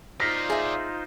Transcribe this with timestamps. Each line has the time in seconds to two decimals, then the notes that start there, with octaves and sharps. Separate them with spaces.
0.20 D#4 F4 C5 D5 F5 F6 A#6 B6
0.50 G#4 E5